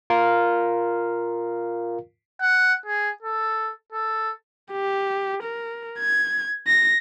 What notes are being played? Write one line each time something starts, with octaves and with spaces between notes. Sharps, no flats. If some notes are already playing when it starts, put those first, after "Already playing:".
F4 A#4 F5
F#5
G#4
A4
A4
G4
A#4
G#6
A#6